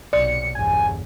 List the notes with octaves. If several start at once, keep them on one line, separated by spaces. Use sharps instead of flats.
B1 C3 D5 C#7
G1 E2 G#5